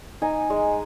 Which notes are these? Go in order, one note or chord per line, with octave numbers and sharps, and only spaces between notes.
D#4 G#5
G#3